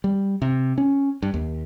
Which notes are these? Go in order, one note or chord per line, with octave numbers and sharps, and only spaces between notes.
G3
C3
C#4
G2
D#2